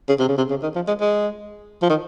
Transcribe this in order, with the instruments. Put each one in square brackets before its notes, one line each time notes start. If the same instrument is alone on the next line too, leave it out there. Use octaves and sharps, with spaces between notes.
[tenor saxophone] C#3
C3
C#3
C3
C#3
D#3
F3
G#3
G#3
F3
D#3